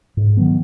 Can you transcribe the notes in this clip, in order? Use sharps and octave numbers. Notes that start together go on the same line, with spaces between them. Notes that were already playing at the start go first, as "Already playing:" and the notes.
G#2
D#3 F#3 B3